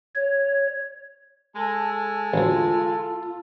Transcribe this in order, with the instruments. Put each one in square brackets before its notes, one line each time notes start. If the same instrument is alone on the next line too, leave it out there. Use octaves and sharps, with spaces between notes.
[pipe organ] C#5
[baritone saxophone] G#3 [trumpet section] A4
[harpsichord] A1 D2 [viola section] F4